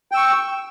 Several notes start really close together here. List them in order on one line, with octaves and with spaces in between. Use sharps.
G5 E6 C#6